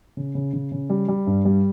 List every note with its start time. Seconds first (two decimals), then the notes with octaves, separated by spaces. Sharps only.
0.17 C#3
0.35 C#3
0.53 C#3
0.72 C#3
0.90 G3
1.08 G3
1.27 G2
1.45 G3